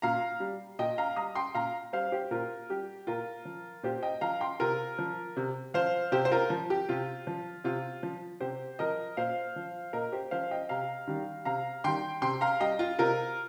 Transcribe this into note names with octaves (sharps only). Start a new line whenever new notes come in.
A#2 F5 A#5
G3
A#2 D#5 G5
F5 A#5
G3 A#5 D#6
G5 C6
A#2 F5 A#5
G3 C5 F5
G4 C5
A#2 F4 A#4
G3 G4
A#2 F4 A#4
F3
A#2 G4 C5
D#5 G5
F3 F5 A#5
G5 C6
C3 F4 A#4
F3
C3
F3 C5 F5
C3 G4 C5
C5
F4 A#4
F3
G4
C3 F4
F3
C3 F4
F3
C3 G4 C5
F3 A#4 D#5
A#2 C5 F5
F3
A#2 A#4 D#5
G4 C5
F3 C5 F5
D#5 G5
C3 F5 A#5
D#3 G3
C3 F5 A#5
D#3 G3 G5 C6
C3 G5 C6
F5 A#5
G3 D#5 G5
F4
C3 F4 A#4